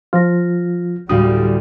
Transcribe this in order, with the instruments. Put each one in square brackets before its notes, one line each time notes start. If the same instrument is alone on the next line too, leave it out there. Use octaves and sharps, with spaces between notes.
[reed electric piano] F3 F4 [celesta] F6 A#6
[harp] D2 A2 [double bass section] G3 [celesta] D4 F#4 F5 [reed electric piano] D#6